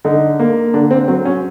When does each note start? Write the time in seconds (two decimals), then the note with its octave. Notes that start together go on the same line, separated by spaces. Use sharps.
0.04 D3 D#4
0.39 A#3
0.74 D3 D4
0.91 C4
1.08 F#3 C4
1.25 C#4